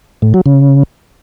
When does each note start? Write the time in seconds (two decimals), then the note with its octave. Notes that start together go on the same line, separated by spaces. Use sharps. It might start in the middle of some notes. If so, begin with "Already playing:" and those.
0.22 A2
0.34 F#3
0.46 C#3